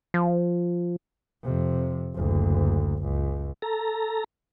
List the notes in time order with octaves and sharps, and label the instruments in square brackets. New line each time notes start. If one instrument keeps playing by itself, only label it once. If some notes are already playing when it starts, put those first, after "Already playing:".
[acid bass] F3
[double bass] F2 C3
F#1 D2
C#2
[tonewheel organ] A4 A#5